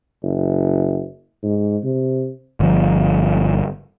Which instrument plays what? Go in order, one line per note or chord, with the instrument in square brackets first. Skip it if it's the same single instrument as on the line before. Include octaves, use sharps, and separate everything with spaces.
[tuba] F#1
G#2
C3
[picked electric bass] G1 F3